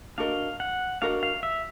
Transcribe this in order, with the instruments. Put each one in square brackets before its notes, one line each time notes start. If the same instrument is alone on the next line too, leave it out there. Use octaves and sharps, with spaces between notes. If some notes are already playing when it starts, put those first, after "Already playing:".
[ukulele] D4 F#4 A#4 D#5 [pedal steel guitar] F5
[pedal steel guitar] F#5
[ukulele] D4 F#4 A#4 D#5 [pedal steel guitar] F5
[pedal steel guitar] F5
E5